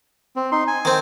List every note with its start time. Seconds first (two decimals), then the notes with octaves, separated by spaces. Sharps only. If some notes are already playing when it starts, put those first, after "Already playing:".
0.36 C4
0.52 D#4 C6
0.67 G#5
0.85 D#3 C4